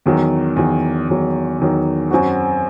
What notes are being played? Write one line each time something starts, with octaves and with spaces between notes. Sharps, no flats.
E2 D#3 F#3
E2 D#3 F#3
E2 D#3 F#3
E2 D#3 F#3
F#2 F#3 C4 F#4